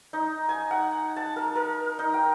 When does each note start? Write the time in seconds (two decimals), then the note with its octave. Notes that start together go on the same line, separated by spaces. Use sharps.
0.13 D#4
0.49 G#5
0.71 F#5
1.16 A5
1.36 A#4
1.55 A#4
1.99 D#4
2.14 G5